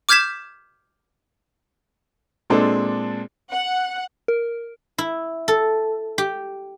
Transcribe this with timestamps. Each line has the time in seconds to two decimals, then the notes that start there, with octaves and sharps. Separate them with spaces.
0.09 D6 F6 G6 G#6 B6 E7
2.50 A#2 G#3 C4 D4 A4
3.52 F#5
4.28 A#4
4.98 E4
5.48 A4
6.18 G4